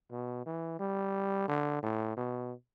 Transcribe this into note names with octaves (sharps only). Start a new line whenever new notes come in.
B2
E3
G3
D3
A2
B2